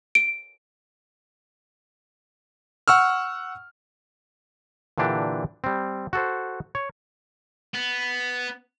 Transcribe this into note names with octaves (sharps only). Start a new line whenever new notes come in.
D7
F#5 C#6 E6 F6
A#2 D3 E3 D4 G4
G3 C4
F#4 A4 C5
C#5
B3